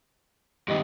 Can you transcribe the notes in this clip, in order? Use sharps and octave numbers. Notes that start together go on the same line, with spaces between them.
G2 D#3 G4 D#5